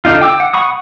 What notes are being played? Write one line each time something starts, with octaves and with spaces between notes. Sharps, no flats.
D3 D4 D#4 F4
G5 D6 E6
F#5
F#5 B5 C#6 D#6